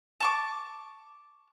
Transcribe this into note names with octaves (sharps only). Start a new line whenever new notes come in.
A5 C#6 D6